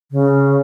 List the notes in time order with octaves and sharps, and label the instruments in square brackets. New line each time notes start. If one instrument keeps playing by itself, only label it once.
[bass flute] C#3